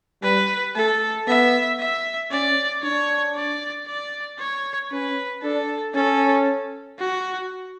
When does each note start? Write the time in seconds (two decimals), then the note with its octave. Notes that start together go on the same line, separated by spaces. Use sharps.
0.23 G3 B4
0.75 A3 A4
1.27 B3 E5
1.79 E5
2.31 C#4 D5
2.83 D4 C#5
3.35 D5
3.87 D5
4.38 C#5
4.91 C#4 B4
5.43 D4 A4
5.95 C#4 A4
6.99 F#4